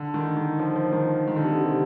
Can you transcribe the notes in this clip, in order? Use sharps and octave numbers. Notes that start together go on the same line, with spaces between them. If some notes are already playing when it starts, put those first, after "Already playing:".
Already playing: D3
D#3
D#3
F3
F3
D#3
D#3
D3
C3
C3